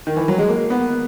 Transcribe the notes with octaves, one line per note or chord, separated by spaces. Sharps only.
D#3
E3
F#3
G#3
A#3
B3